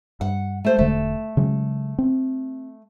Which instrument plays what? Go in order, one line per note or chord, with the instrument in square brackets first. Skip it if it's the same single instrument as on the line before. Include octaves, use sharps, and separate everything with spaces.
[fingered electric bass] G2 [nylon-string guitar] F#5
[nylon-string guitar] A3 C5
[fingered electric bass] E1 D3 [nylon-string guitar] A3
[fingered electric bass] C#3 F#3 G#3
C4